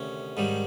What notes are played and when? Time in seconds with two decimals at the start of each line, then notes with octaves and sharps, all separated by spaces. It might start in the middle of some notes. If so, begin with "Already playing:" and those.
Already playing: D2 C3 D#3 C#4
0.37 G#2 D#3 G3